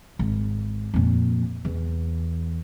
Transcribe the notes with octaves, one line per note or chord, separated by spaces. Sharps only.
G#1
F2 A#2
E2